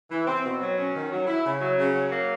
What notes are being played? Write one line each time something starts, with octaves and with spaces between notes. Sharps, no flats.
E3
C4
B2
F#3
C#4
D#3
F#3
E4
C#3
F#3
C#3
F#3
A#3